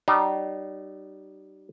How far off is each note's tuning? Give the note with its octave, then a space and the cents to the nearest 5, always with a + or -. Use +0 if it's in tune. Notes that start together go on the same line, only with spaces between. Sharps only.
G3 -35 D#4 -40